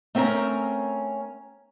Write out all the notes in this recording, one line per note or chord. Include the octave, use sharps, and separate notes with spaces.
A3 C4 C#4 A#4 A#5